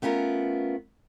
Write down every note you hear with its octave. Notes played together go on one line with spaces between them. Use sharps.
A3 B3 C#4 F4 A#4